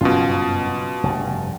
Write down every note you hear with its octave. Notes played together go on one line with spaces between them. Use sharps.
F#1 G2 B2 C#4 F4
F1 G2